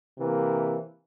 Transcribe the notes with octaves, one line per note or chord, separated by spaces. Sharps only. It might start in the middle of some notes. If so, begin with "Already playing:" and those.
C3 E3 A#3